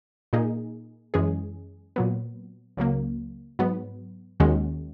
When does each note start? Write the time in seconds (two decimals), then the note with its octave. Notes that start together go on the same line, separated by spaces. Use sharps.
0.33 A#2 A#3 D#4 G#4
1.14 F#2 E3 G#3 C#4 G#4
1.96 A#2 F#3 B3
2.77 C#2 C#3 F#3 A#3
3.59 G#2 F#3 B3
4.40 D#2 D#3 G#3 C#4 F#4